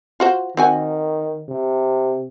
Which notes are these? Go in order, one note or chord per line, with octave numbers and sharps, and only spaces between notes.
F4 F#4 C5
D#3 C4 F#4 G#5
C3